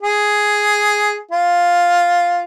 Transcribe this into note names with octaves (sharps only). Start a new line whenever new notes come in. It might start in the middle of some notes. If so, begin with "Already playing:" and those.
G#4
F4